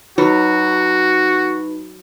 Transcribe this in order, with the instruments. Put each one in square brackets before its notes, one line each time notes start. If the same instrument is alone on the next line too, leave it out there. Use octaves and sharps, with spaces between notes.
[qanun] F#3 [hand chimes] D#4 B4 B5 [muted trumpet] F#4